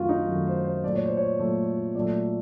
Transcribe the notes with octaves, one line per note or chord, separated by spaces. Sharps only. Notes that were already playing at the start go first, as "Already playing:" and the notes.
Already playing: F#2 D#3 F#3 A3 F4 F#4
D#4
F#2 D#3 F#3 A3 F#4
C5
C5
A#2 F#3 A3 D5
C#5
C5
C#5
A#2 F#3 A3
A#2 F#3 A3 D5